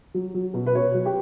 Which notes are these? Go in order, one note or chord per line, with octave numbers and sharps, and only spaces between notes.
F#3
F#3
B2
B4
B2 C#5
F#3
G4